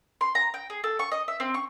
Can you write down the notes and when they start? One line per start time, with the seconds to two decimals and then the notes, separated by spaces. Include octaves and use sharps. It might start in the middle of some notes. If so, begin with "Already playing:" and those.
0.21 C6
0.35 A#5
0.54 G5
0.70 G#4
0.84 A4
0.99 C#6
1.12 D#5
1.28 E5
1.40 C4
1.54 C#6